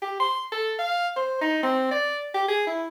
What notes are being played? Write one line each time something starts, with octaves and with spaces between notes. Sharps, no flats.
G4
C6
A4
F5
C5
D#4
C4
D5
G4
G#4
E4